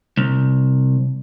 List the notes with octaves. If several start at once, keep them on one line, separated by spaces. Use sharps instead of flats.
C2